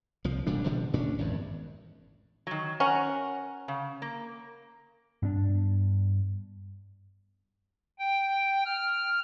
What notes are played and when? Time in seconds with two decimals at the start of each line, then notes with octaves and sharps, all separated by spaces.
0.24 C2 F3
0.47 E1 A#2 G3 D4
0.65 B2 D3 F3 G3
0.93 A2 C#4 D4
1.19 G#1 E2 G2
2.47 D#3 F#3
2.80 C#4 A#4 F#5
3.68 C#3
4.02 A#3
5.22 G2 B3 D4
7.99 G5
8.65 F6